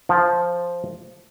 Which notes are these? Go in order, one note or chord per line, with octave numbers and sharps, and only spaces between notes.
F3